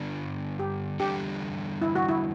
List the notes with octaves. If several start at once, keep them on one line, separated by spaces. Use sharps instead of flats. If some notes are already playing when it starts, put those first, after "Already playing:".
Already playing: G2 D3 G3 B3 D4
G4
E2 D3 G3 D4 G4 A4
E4
F#4
E4